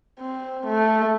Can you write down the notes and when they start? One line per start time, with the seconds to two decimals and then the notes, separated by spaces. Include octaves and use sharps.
0.20 C4
0.66 A3